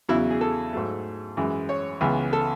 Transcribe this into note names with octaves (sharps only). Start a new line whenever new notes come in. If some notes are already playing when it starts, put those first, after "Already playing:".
E2 C#3 F#3 E4
G#4
A4
G#2 F#3 A3
F#2 E3 G#3
C#5
C#2 C#3 E3 B3
A4